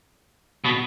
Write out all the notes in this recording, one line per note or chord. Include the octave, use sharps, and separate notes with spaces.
B2